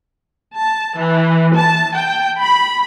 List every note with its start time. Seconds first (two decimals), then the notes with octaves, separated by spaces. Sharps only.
0.55 A5
0.99 E3
1.56 A5
1.95 G5
2.40 B5